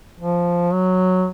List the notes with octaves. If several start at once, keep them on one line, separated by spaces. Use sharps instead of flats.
F3
F#3